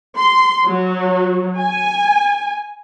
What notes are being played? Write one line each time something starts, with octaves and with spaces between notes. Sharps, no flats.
C6
F#3
G#5